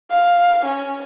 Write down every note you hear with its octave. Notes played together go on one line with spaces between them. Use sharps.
F5
C#4